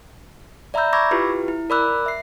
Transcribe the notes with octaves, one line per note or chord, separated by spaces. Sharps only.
D5 E5 A#5 B5 E6 G6
B5 C#6 D6 E6 G#6 A#6
E4 F4 G4 B4
E4
A#4 D5 B5 D6 E6 F#6
E5 C7